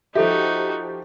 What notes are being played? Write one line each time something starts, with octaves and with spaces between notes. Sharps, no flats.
F3 D#4 F#4 G4 A4 E5